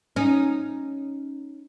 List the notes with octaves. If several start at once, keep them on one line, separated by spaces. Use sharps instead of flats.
C#4 D#4